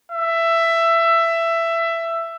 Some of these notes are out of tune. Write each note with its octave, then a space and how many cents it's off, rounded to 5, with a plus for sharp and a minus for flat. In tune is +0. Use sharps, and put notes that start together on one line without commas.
E5 +15